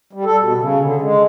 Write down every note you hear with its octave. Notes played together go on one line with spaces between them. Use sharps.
G3
A4
B2
C#3
D3
G#3